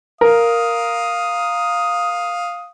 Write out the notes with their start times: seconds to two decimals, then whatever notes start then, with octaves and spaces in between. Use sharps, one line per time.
0.21 A#4 F5 D#6